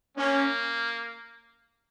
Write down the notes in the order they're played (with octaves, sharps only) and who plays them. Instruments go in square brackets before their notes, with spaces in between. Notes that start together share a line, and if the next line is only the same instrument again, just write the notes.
[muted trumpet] A#3 [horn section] C#4